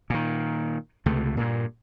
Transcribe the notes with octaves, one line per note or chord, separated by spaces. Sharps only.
A#2 D#3
C#2 C3 A3
G2 A#2